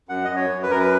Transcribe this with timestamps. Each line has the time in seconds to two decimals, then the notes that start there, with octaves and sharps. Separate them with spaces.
0.09 F#2 F#5
0.25 F#2 D#5
0.36 C#5
0.50 F#2
0.63 B4
0.69 F#2 A#4
0.79 B4